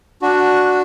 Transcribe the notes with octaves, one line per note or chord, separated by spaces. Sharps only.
D4 F#4